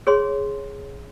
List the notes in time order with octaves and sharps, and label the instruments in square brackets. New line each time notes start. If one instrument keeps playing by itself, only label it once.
[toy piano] G#4 C#5 C6